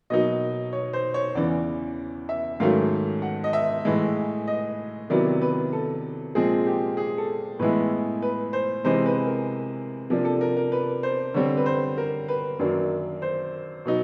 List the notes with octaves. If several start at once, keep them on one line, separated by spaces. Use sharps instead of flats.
B2 F#3 A#3 D#4 D#5
C#5
C5
C#5
E2 C#3 E3 D5
E5
G#2 D#3 F#3 A3 C#4 F5
F#5
D#5
E5
A2 E3 G#3
D#5
C3 D#3 F#3 B3 E4 D5
B4
A4
A#2 F3 G#3 C4 G#4
G4
G#4
A4
A2 E3 G#3 B3 E4 B4
B4
C5
C3 E3 G#3 C5
B4
A#4
C3 F3 A#3 D4
A4
A#4
A#4
B4
C5
D3 G3 C4 C#5
B4
C5
A#4
B4
F#2 D#3 F#3 A#3 D4
C5
B2 F#3 B3 D#4